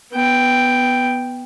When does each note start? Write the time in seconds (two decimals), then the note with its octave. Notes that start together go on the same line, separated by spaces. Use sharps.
0.12 B3 G5